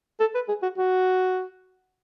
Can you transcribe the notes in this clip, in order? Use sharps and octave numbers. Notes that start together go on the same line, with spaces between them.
A4
B4
G#4
F#4
F#4